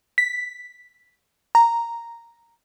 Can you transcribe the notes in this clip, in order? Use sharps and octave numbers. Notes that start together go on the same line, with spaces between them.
B6
A#5